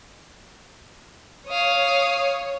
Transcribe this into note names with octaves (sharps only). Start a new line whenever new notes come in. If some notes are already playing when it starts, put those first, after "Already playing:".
C#5 F5 D#6